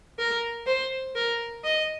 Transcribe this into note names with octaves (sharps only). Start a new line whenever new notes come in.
A#4
C5
A#4
D#5